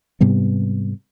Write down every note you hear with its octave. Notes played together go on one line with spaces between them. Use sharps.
G#2 C3 G3 B3